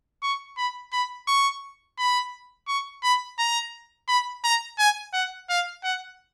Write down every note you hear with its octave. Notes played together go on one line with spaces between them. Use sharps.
C#6
B5
B5
C#6
B5
C#6
B5
A#5
B5
A#5
G#5
F#5
F5
F#5